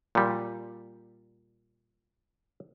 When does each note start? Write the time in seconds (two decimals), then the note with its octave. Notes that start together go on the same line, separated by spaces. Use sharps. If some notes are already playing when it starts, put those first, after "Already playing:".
0.15 A#2 G3